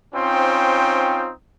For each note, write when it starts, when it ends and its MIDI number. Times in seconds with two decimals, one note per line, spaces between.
0.15 1.31 60
0.15 1.31 61
0.15 1.31 63
0.15 1.31 65
0.15 1.31 72
0.15 1.31 79